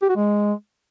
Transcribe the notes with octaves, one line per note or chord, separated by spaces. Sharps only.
G4
F#4
G#3